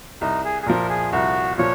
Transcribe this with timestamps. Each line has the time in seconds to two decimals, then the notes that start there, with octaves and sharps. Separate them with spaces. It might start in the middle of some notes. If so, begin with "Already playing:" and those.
0.21 C2 D#4
0.45 G#4
0.62 G#4
0.66 A#2 F3 A#4
0.89 G#4
1.12 C2 F#4
1.58 A#2 F3 C#5